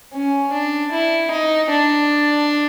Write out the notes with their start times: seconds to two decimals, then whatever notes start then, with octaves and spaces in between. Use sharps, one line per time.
0.14 C#4
0.53 D4
0.92 E4
1.31 D#4
1.70 D4